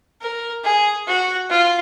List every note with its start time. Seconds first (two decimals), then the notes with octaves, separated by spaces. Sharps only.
0.21 A#4
0.64 G#4
1.07 F#4
1.50 F4